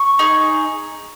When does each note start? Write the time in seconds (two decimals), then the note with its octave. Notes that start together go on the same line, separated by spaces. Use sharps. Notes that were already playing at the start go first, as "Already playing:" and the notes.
Already playing: C#6
0.19 D#4 G#4